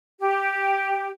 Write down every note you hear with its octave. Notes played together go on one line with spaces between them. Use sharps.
G4